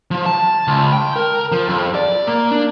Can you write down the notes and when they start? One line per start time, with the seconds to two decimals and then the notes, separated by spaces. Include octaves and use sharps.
0.11 F3
0.26 A5
0.67 C#2
0.93 G5
1.16 A#4
1.52 F3
1.69 F2
1.95 D5
2.27 A#3
2.51 D4